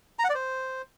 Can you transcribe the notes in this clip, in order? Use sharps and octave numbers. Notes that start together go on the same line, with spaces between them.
A#5
F#5
D5
C5